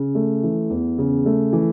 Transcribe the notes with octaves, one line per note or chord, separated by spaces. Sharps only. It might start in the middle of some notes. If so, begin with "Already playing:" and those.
Already playing: C#3
A3
E3
E2
C#3
A3
E3